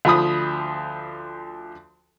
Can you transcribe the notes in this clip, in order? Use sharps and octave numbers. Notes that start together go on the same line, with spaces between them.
D2 F3 B5 D#6